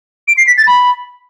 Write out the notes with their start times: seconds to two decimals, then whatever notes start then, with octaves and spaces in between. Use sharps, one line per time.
0.28 D7
0.37 C7
0.47 B6
0.58 A6
0.67 B5